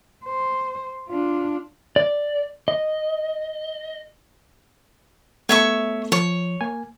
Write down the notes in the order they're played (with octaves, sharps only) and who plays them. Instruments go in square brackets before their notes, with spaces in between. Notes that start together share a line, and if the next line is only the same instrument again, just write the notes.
[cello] C5
D4 F4
[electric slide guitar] D5
D#5
[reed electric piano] A3 B3 A4 [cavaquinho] C#5 E5 C#6
[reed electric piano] F3 [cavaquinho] C#5
[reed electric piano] A#3 G#5